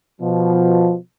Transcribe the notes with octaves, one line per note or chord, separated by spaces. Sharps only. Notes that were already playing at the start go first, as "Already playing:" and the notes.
B2 F3